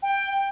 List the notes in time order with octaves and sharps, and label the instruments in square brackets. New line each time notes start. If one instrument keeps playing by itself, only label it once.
[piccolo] G5